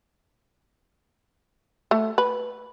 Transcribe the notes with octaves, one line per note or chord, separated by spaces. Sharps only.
A3
B4